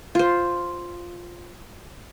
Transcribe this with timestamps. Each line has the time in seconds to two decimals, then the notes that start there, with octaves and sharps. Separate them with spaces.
0.15 F4 C5